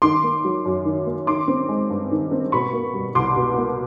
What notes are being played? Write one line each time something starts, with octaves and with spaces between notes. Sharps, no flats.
D#3 C6 D6
A#3
F#3
F#2
D#3
A#3
D#3 C6 D6
C4
G#3
G2
D#3
C4
B2 B5 C#6
A#3
G3
C2 C6 D6
B2
A#3